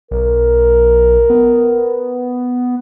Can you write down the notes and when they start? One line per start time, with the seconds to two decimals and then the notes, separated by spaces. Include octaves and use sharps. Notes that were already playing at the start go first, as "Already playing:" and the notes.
0.11 B1 A#4
1.30 B3